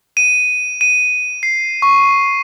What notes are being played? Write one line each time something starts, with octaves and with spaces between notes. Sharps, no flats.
D#7
D#7
C7
C#6